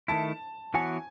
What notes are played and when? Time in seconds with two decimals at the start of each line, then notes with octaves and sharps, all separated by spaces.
0.08 D#3 A3 E4 A5
0.74 E3 B3 F#4 C#5 G#5